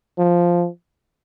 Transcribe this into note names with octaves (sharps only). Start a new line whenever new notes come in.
F3